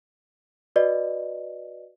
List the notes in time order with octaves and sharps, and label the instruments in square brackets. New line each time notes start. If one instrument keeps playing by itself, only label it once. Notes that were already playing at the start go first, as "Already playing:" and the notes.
[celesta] F#4 B4 D5 D#5